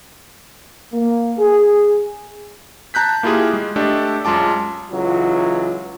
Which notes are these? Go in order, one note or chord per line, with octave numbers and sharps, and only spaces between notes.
A#3
G#4
A5 A#5 F#6 G6 B6
A#3 E4 F4 G4 G#4
G#3
A3 D4 G4 A4 D#5
F#2 G#3 F4 A5 D6
C#2 E3 F#3 F4